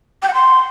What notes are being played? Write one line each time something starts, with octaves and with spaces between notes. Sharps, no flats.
G5
F#5
C6